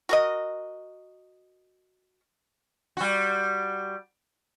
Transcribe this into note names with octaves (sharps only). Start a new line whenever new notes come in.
F#4 A#4 D#5
G3 F#4